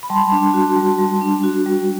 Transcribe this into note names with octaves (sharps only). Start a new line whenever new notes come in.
B5
G3 A5 C6
D4
F#4
G3
G3
D4
F#4
G3